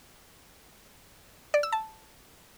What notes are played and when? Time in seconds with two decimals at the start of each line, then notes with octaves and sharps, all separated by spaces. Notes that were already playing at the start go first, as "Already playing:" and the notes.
1.54 D5
1.63 E6
1.72 A5